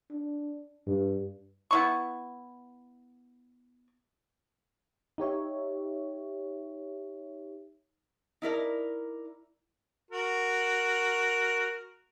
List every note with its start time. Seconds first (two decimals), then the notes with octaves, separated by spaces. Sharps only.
0.11 D4
0.87 G2
1.71 B3 E4 C#6
5.18 D#4 G4 C#5 E5
8.42 D#4 E4 A#4 D5
10.11 F#4 A#4